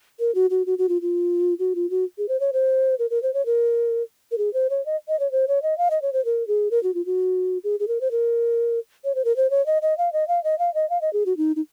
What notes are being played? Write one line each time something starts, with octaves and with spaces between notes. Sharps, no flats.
A#4
F#4
F#4
F#4
F#4
F4
F4
F#4
F4
F#4
G#4
C5
C#5
C5
A#4
A#4
C5
C#5
A#4
A#4
G#4
C5
C#5
D#5
D#5
C#5
C5
C#5
D#5
F5
D#5
C#5
C5
A#4
G#4
A#4
F#4
F4
F#4
G#4
G#4
A#4
C5
A#4
C#5
C5
A#4
C5
C#5
D#5
D#5
F5
D#5
F5
D#5
F5
D#5
F5
D#5
G#4
F#4
D#4
D#4